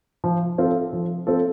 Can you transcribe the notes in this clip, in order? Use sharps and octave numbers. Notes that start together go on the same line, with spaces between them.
F3
C4 F4 A4
F3
C4 F4 A4